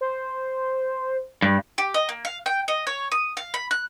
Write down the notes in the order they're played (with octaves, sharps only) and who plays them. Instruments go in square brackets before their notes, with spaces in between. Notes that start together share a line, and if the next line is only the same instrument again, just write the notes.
[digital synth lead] C5
[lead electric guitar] G2
[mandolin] G4
D#5
A#3
F5
G5
D#5
C#5
D#6
F5
B5
F#6